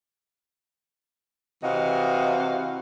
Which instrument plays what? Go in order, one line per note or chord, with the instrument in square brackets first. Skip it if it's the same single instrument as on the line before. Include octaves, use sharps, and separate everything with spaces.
[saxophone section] C3 E3 F#4 D#5 F5